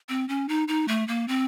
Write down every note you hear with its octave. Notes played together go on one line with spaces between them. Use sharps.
C4
C#4
D#4
D#4
A3
A#3
C4